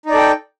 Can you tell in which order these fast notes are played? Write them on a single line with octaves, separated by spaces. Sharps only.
D#4 D5 A4 G5